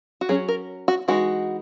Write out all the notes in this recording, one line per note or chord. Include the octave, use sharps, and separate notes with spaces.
F#4
F#3 C#4 G#4
A#4
F#4
E3 G#3 D#4 F#4